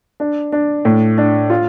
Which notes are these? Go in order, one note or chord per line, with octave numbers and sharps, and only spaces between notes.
D4
D4
A2
D4
F4